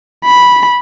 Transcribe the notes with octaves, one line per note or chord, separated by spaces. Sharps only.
B5